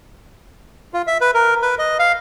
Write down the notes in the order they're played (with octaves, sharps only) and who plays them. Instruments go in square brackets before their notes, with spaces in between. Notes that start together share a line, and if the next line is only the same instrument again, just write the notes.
[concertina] F4
E5
B4
A#4
B4
D#5
F5